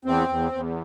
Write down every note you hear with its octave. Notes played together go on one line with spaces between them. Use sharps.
E2 C4
E2
E2